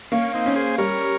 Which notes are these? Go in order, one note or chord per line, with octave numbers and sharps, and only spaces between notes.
A#3 C#4
C4 D#4
C#4
G#4 C5
G3 A#4 C#5